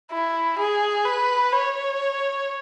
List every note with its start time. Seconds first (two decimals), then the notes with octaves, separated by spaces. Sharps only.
0.11 E4
0.59 G#4
1.05 B4
1.53 C#5